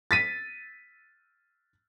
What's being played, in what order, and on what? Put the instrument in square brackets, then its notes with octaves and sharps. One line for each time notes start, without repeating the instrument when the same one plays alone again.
[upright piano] A6 B6 D#7